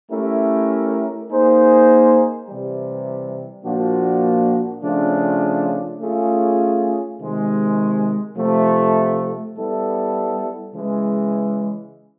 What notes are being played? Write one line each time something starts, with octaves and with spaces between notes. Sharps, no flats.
A3 C#4 E4 G4 A#4
A#3 D#4 G#4 C5
C3 E3 G3
A#2 F3 A#3 D4 F#4
C#3 F3 A3 D4 F4
A3 C#4 F4 G#4
C3 D#3 G#3
C3 F3 A3
G3 B3 E4 A4
C#3 E3 G#3